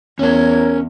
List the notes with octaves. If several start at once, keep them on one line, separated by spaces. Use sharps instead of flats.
E2 C#4 A#4 C#5 A5 G#6